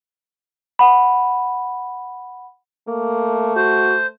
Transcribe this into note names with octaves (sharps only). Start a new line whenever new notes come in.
F#5 B5
A3 A#3
F#4 C5